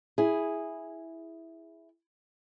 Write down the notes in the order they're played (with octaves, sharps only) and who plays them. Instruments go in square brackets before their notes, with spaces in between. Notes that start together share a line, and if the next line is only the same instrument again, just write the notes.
[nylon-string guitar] E4 G#4